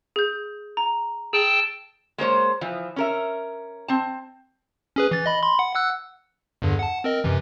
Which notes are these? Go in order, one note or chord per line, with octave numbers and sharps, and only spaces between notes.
G#4 G6
A#5
G#4 G5 A5 E6
G#3 A#3 C5 C#5
E3 F3
C#4 A#4 E5
C4 A5
C#4 G#4 B4
E3 A6
D#5 B5
B5 C6
F#5
F#5 E6 F#6
E2 G2 D3
F#5 A5
C4 A#4 D#5
F#2 C3 E3